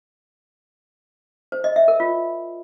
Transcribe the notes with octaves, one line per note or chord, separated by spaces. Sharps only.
C5
D#5
E5
A#4
F4